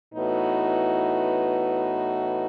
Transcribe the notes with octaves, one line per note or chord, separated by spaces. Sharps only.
A2 E3 B3 D#4 F#4